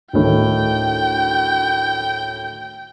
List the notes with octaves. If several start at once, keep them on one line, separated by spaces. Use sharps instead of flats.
D2 A2 D#3 G5